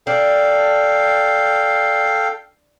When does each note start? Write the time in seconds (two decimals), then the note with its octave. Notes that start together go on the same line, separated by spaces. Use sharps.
0.07 D4 A4 F5 G5